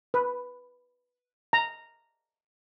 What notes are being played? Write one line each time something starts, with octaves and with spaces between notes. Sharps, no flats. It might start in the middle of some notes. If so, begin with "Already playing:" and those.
B4
A#5